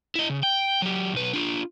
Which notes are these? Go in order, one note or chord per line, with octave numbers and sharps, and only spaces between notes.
E4 D#5
C#3
G5
F#3 G4
B1 B4
D4 F4